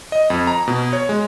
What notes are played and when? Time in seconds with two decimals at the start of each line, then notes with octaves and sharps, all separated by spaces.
0.12 D#5
0.30 F2
0.47 A#5
0.68 B2
0.93 C#5
1.09 G#3